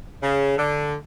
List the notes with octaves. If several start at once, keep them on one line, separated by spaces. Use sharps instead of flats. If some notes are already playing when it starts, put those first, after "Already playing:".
C#3
D3